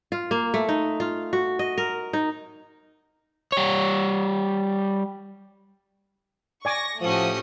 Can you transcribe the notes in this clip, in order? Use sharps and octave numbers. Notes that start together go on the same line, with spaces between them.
F4
A#3
A3
D#4
F4
F#4
D#5
A#4
D#4
G3 C#5
D5 G#5 C#6 D6 A#6
A2 F3 A3 C#4 F#4 G4 D#6